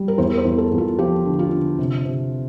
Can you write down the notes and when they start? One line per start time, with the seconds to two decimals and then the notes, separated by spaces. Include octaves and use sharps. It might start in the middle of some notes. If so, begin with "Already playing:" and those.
Already playing: G3
0.08 A#4
0.18 E2 C5
0.34 A#4
0.38 C5
0.45 E2
0.58 A4
0.72 E2
0.78 F4
0.99 F3 G4
1.26 D3
1.39 F4
1.51 D3
1.78 C3
2.05 C3